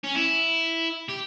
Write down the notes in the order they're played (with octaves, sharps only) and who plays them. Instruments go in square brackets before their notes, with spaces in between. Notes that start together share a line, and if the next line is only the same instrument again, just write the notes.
[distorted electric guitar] C#4
E4
G4